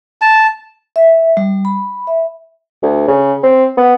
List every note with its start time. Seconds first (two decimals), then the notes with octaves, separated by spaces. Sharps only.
0.21 A5
0.96 E5
1.37 G3
1.65 B5
2.07 E5
2.83 D2
3.08 C#3
3.43 C4
3.77 B3